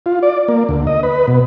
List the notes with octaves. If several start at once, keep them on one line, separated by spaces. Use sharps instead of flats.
F4
D5
A#3
D2
D#5
B4
B2